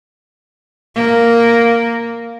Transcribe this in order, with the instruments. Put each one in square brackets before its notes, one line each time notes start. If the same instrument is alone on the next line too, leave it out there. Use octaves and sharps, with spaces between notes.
[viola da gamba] A#3